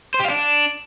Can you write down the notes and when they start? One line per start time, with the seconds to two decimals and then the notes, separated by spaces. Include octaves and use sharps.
0.14 C5
0.20 G4
0.25 F5
0.30 D4